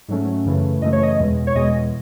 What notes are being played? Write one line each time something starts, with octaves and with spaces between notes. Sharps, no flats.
G#2 F#3 A3 C#4
F#2 C#3 E3 A3
F#2 C#3 E3 A3 D#5
C#5
D#5
E2 B2 G#3
C#5
E2 B2 G#3 D#5